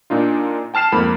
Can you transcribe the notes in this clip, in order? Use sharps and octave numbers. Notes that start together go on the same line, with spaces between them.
A#2 D4 D#4 F4
G5 A5 F6 C7 E7
F2 G#2 A#3 B5